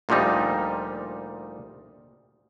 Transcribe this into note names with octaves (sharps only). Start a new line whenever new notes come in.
D2 A#2 F3 G3 D#4